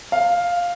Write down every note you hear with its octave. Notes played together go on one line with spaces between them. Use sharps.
F5